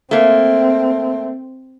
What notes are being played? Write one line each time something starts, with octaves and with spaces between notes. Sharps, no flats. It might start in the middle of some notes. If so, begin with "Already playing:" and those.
A3 A#3 C4